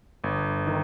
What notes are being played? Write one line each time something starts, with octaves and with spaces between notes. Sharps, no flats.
G1
D#3